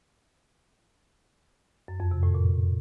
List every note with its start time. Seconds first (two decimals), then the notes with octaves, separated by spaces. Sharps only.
1.88 F#2
2.00 F2
2.11 C3
2.23 A2
2.35 A#2